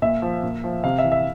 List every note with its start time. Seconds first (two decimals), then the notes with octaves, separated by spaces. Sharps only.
0.02 A#2 E5
0.22 F3
0.43 A#2
0.64 F3
0.84 C3 F5
0.99 E5
1.04 E3
1.12 E5